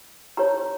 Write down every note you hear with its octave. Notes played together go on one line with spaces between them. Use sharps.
D#4 G4 C#5 A#5